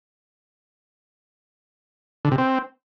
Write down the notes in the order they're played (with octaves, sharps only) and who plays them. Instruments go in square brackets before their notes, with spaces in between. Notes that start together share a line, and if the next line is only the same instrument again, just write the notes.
[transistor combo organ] D3
C3
C4